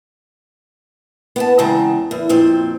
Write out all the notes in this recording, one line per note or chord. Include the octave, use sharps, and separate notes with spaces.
B3 G5 A5
E2 C#3 G#3 C4 A5 A#5
E2
F2 A#2 C4